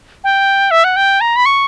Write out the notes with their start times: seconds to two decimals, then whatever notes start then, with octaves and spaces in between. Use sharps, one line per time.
0.24 G5
0.71 E5
0.84 F#5
0.96 G5
1.21 A#5
1.36 B5
1.46 C#6